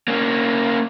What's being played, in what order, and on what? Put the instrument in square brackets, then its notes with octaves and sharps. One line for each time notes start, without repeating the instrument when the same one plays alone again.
[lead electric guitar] A#3 C#4